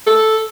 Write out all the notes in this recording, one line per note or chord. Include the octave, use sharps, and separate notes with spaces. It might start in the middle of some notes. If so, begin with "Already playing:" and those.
A4